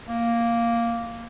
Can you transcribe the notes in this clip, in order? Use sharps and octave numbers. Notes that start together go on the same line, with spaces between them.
A#3